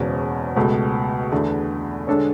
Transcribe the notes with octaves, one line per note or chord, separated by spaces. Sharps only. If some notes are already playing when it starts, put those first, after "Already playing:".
Already playing: F#1 E2 B2 G#3 C#4
C#2 B2 A3
E2 D3 A3
D3 G#3 D4 A4 C#5